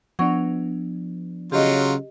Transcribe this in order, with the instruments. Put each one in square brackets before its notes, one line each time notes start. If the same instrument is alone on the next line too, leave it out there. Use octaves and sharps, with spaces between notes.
[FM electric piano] F3 B3 D4 [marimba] F#5 C#6
[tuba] C#3 [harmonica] F#3 F4 [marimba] G4 D#5